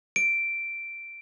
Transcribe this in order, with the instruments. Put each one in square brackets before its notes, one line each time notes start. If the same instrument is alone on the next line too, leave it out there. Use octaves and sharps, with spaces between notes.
[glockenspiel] D7